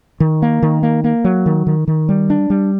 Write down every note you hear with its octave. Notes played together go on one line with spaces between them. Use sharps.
D#3
A#3
D#3
A#3
A#3
F#3
D#3
D#3
D#3
G3
D4
G3